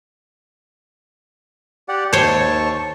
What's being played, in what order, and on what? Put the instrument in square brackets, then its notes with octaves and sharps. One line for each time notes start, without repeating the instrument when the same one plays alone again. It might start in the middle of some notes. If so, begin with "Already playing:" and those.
[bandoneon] G4 D5 F#5
[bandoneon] D#2 A5 C#6 [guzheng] C5 C#5